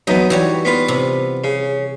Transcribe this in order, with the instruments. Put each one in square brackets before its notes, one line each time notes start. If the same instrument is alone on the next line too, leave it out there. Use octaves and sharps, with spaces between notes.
[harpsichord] F#2 E3 B3 [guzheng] D#4
[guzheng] E3 G3 C#5 [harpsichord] F#4
[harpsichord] B3 F4 B4
[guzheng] C3
[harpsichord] C#3